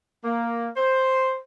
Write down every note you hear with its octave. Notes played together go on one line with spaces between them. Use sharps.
A#3
C5